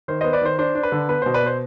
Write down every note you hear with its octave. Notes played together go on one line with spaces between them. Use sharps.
D#3 C5
B3 C5 D#5
B4 D5
D#3 C5
D4 C5
D4
B4
D3
B3 B4
B2 C5
B4 D5
B3 C5